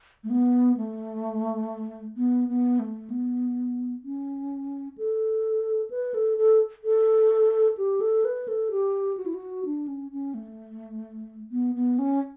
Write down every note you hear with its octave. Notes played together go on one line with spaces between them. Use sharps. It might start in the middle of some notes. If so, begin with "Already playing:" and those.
A3
B3
A3
B3
B3
A3
B3
C#4
A4
B4
A4
A4
A4
G4
A4
B4
A4
G4
F#4
E4
F#4
D4
C#4
C#4
A3
B3
B3
C#4